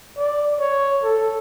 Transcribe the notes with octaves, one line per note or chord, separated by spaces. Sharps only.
D5
C#5
A4